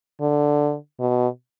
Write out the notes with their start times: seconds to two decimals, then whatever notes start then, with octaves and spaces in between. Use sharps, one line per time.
0.20 D3
1.00 B2